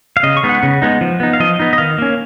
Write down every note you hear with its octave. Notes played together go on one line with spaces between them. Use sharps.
F5
C#3 D#5
C#6
G#3 B3 D#4
F#5
C#3
G#3 B3 D#4
F3
B3 D#4
F5
F3 D#5
B3 D#4
D#5
D#3 F5
A#3 C#4